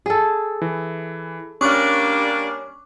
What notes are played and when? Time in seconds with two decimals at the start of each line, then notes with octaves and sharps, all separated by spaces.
0.06 G#4 A4
0.62 E3
1.61 G3 A#3 C#4 D4 C#6 D6 F#6